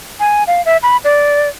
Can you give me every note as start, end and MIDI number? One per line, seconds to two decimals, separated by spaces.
0.20 0.44 80
0.47 0.64 77
0.65 0.77 76
0.83 0.97 83
1.04 1.49 74